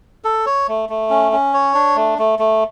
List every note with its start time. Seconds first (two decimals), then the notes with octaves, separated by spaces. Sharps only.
0.24 A4
0.46 C#5
0.68 A3
0.89 A3
1.10 C#4
1.32 C#4
1.53 C#5
1.75 D4
1.96 A3
2.18 A3
2.39 A3